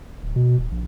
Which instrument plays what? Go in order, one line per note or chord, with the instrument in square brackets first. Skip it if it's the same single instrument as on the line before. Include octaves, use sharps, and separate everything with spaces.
[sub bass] D1
B2
D#1
A#1